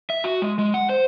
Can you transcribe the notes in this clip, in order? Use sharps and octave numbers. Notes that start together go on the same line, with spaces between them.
E5
F#4
G#3
G#3
F#5
C5